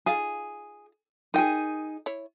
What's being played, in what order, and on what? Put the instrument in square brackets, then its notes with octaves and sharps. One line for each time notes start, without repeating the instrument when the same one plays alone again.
[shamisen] D#4 F4 F5 [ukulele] G#4
[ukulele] D#4 G#4 [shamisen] A#4 G5
[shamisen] E4 C#5